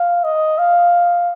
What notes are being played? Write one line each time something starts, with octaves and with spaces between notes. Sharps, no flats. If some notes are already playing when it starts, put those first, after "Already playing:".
Already playing: F5
D#5
F5